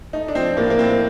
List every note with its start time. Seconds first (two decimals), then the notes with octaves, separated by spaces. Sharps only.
0.13 A3 D#4
0.28 D4
0.35 F3 C4
0.57 A2 A#3
0.70 A#3
0.79 A2 C4